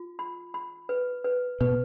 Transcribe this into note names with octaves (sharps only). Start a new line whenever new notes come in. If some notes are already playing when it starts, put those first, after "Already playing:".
Already playing: F4
B5
B5
B4
B4
B2 B4